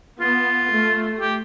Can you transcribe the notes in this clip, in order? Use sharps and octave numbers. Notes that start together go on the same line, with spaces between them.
B3 F4
A3
G4